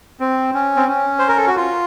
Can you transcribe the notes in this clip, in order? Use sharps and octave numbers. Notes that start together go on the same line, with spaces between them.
C4
C#4
C4
C#4
C5
A#4
A4
F#4
F4